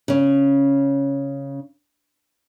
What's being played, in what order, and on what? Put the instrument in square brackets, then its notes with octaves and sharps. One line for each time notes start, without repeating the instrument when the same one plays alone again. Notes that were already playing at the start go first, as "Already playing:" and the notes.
[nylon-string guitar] C#3 C#4